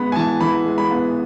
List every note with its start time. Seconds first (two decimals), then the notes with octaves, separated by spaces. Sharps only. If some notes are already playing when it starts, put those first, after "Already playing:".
Already playing: G#3 B3 B5
0.12 G#5
0.16 E3 A5
0.41 E3 B5
0.65 G#3
0.78 B5
0.90 B3